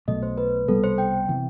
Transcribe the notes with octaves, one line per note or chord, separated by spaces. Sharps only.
B1 B2 A3 D#5
C5
B4
C2 B2 G3 B3 A4
C5
G5
C3 E3 B3